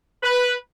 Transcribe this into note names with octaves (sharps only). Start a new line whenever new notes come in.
B4